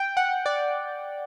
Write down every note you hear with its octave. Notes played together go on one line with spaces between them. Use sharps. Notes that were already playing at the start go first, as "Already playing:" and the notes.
Already playing: G5
F#5
D5